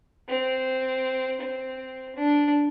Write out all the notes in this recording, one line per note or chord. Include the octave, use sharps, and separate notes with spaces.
C4
C4
D4